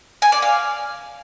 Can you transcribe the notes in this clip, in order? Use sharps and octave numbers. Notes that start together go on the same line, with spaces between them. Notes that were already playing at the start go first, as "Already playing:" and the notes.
G#5
D5
F5